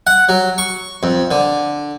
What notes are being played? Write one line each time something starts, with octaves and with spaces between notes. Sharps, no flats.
F#5
F#3
C#6
F2
D3